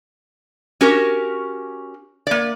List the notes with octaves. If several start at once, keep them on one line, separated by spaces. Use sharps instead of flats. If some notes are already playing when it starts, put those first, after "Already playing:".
C#4 F#4 G4 A#4
A#3 D5